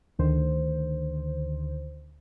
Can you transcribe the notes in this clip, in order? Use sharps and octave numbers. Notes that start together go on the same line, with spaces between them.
D2 D3 D#3 C5